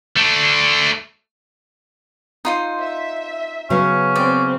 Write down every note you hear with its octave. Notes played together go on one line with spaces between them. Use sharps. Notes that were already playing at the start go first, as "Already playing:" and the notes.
A3 D4
D#4 F4 C5
E5
C#3 F#3 B3 C#4
C4 D5